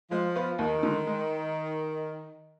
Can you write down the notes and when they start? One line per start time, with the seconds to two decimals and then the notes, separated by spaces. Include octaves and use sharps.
0.11 F3 G#3
0.35 B3 F4 B4
0.59 D#2 D#3
0.83 D3 G#3
1.07 G#3